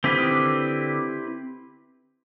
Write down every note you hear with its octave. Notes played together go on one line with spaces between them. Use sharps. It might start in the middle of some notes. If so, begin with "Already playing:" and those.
D3 C4 E4 G4 B4
D#3
D3